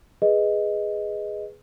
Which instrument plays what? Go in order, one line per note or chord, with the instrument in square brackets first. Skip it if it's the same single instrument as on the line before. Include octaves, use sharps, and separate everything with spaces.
[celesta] G#4 B4 D#5